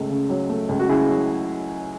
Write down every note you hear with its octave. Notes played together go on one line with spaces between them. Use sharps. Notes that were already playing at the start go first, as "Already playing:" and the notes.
Already playing: C#2 A3
C#3
F#3
A3
C#2
F#4
C#3 E4 G#4
F#3